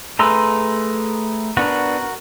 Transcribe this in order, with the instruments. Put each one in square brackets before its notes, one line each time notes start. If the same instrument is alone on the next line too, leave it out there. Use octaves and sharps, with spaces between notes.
[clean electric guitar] A3 G#4 B4 [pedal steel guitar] A#5 C6 E6
[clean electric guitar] B3 D4 [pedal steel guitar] F#4 A#4